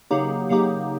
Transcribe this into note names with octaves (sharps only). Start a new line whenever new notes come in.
C#3 F#3 A#3 D#4 G4
C#3 F#3 A#3 D#4 G4